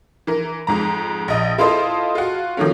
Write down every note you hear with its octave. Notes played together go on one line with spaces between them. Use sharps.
E3 A#4
F2 G#2 A#5
A#1 D#5
E4 F4 A4 C5 D#5
F4 F#4
D#3 F3 F#3 A3 C#4